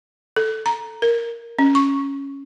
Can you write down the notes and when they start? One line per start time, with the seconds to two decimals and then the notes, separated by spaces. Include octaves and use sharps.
0.36 A4
0.66 A#5
1.02 A#4
1.59 C#4
1.75 C#6